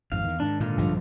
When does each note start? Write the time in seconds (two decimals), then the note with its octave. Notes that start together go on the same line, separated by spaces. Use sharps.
0.12 G#1 F2 G#2 F5
0.24 E2 D#3
0.40 G#2 D#3 D4
0.60 A#2 D3 F4
0.77 A#1 G2 F3